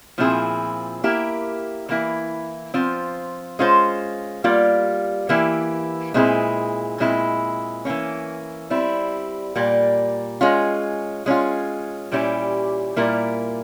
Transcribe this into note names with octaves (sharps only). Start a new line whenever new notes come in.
A#2 F3 C4 E4 G#4
A#3 E4 G4 A#4
E3 A#3 E4
F3 C4 F4
G#3 C#4 F4 C5
G3 A#3 F4
E3 A#3 E4 G4
A#2 G#3 C4 E4 G#4
A#2 G#3 C4 E4
E3 A#3 C#4
G3 C4 E4
A#2 G3 A#3
G#3 C#4 F4
G#3 C#4 F4
A#2 G3 C#4 E4 G4
A#2 G3 A#3 E4 A#4